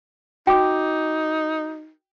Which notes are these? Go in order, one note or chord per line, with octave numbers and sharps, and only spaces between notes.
D#4 F#4 G5 D6